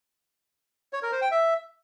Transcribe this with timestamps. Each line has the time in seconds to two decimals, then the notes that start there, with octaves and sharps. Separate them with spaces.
0.93 C#5
1.03 A#4
1.12 C5
1.22 G5
1.31 E5